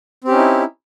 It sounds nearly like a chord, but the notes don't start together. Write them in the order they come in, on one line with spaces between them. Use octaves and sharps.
C4 G4 C#4 D#4 E4